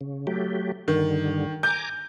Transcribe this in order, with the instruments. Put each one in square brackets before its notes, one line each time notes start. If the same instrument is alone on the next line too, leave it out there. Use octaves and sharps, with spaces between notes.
[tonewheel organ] C#3
F#3 A3 G4
[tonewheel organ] G2 D3 [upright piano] D#3
[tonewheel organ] G#5 A#5 D6 [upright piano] G6